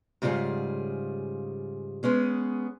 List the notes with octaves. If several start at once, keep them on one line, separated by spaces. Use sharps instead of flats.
G#2 C#3 G3 F4 G#4
G#3 B3 C#4 G#4